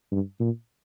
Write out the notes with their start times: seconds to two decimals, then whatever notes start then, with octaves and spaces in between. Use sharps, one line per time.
0.11 G2
0.40 A#2